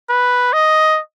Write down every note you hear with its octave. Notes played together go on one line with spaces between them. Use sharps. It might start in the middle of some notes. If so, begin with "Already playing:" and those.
B4
D#5